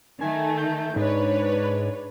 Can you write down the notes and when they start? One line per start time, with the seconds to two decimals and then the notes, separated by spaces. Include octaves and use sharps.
0.21 D#3 A3 G#5
0.58 G6
0.96 G#2 D4 B4 C#5